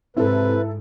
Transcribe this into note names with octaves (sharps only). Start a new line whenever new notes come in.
G#2 C3 E4 A4 B4